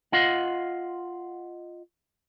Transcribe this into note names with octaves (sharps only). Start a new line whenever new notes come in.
F4 D#5 F5 F#5